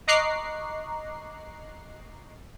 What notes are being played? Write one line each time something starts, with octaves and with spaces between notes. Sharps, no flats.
D#5 A#5 C#6 D6 F#6 C7